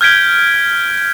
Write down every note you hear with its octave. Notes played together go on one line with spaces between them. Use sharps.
F6 G6 G#6 B6 D7 G7